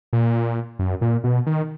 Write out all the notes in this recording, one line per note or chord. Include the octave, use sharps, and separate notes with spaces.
A#2
F#2
A#2
B2
D#3